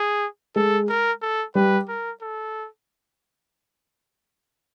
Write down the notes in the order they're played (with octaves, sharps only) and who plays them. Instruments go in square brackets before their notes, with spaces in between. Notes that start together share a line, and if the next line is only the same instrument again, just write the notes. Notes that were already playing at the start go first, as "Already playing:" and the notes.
Already playing: [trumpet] G#4
[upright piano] G#3 [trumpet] A4
[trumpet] A#4
A4
[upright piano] G3 [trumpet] B4
[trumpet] A#4
A4